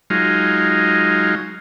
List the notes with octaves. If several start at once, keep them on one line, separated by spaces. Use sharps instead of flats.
F#3 G#3 D#4 F4